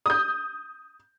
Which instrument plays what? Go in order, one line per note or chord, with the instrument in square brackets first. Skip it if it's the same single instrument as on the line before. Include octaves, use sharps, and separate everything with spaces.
[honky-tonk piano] D#6 G6